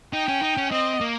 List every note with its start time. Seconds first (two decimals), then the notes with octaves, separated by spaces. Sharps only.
0.13 D#4 G5
0.28 C#4
0.42 D#4
0.57 C#4
0.72 C4 D#5
1.01 A#3